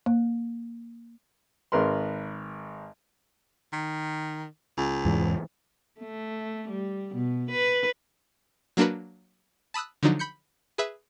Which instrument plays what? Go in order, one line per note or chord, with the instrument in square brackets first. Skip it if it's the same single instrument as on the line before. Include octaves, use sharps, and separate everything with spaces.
[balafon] A#3
[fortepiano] G#1 A#4 B4 C6
[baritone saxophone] D#3
C#2
[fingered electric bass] E2 G#2 E3
[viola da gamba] A3
G3
B2
B4
[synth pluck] F#3 A#3 D4 F#4 A#4 B4
A5 B5 D#6 E6 F#6
D3 F3 F#3 D4 D#4
B5 G6 C#7
G#4 B4 E5